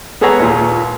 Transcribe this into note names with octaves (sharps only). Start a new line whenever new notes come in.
B3 G#4 A4 C#5 F#5 A#5
D#2 A#2